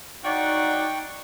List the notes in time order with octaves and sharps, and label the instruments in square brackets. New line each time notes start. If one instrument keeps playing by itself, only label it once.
[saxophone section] F#3 D4 D5 [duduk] D#4 [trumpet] F#5 [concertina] G5 C#6